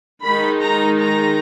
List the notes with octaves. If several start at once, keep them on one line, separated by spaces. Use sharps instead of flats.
D#3 G#3 D#4 B5
A#5
A#5